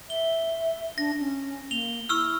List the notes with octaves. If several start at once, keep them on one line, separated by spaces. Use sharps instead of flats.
E5 G7
D4 A#6
C#4
A#3 F7 G7
E4 C#6 E6 F6